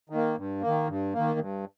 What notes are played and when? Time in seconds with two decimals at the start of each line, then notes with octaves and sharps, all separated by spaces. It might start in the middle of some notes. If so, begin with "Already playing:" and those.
0.10 D#3
0.15 A#3
0.37 G2
0.62 A#3
0.67 D#3
0.88 G2
1.14 D#3 A#3
1.39 G2